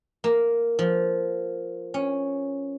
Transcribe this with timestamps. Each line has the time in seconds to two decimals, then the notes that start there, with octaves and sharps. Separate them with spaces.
0.24 A#3
0.79 F3
1.94 C#4